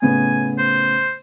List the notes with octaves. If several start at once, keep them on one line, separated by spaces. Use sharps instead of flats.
A2 C#3 B3 G#5
C5